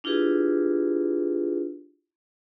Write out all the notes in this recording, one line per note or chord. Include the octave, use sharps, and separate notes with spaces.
D4 E4 F4 G4 G#4 B4